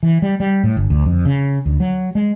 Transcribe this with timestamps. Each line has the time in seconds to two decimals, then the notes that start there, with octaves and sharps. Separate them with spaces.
0.03 E3
0.22 G3
0.40 G3
0.64 A2
0.77 G1
0.90 D2
1.05 F2
1.25 C#3
1.66 D2
1.80 F#3
2.15 G#3